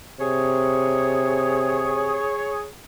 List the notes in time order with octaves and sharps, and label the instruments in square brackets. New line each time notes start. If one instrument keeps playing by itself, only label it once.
[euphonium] C3 [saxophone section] G#4 C#5